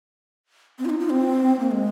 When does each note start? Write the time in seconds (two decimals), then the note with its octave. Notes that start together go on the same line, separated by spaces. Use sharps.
0.79 C4
0.85 F4
0.89 D#4
1.00 F4
1.10 C4
1.59 A#3
1.71 G#3